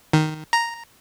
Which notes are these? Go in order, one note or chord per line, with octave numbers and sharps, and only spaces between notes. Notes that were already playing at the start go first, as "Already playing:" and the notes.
D#3
A#5